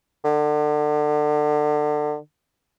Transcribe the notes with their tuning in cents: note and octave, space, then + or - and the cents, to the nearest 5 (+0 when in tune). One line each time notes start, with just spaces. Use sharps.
D3 +30